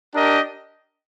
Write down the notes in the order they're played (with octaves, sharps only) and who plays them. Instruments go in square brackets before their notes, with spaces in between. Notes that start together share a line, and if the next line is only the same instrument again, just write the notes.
[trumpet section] D4 G4 A#4 D#5